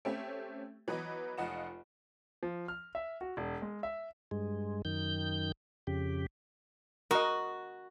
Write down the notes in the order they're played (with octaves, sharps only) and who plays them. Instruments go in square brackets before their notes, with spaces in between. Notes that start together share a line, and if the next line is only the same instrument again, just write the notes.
[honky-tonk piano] A3 C4 C#4 G4 E5
E3 F#3 B3 B4 D#5
F1 F4 D#5 F#5 E7
[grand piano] F3
F6
E5
F#4
E1
G#3
E5
[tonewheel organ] G2 G#3
F#2 D#3 G6
F2 C#3 G4
[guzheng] F#4 [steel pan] A#4 D#5